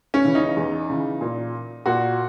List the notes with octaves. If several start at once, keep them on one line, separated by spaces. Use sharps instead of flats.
C#4
C#3 E3
D#4
E2
C#3 E3
A#2
A#2 F#4